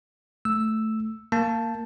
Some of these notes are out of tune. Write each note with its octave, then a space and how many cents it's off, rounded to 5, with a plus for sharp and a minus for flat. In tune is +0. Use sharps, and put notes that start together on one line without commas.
A3 +0 E6 +0
A#3 -15 A5 +0